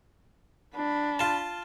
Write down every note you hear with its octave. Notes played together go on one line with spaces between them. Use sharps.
D4 B5
F4 A5